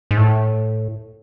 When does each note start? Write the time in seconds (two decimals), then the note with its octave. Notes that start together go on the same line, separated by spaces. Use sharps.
0.11 G#2
0.17 A2